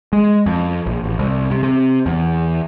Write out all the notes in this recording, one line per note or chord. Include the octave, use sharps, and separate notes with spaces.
G#3
F2
A#1
A1
C2
C3
C3
E2